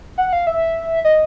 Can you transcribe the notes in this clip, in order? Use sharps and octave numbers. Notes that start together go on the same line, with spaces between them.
F#5
F5
E5
D#5